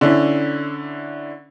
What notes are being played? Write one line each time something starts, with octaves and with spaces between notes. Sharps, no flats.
D3 C#4 D4 E4